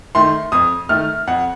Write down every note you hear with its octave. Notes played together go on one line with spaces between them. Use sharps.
D#3 A3 C6
F2 D#6
D#3 A3 F6
F2 F#5